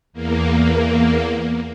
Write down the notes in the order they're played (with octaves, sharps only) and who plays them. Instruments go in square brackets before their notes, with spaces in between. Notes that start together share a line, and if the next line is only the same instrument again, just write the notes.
[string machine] E2 A#3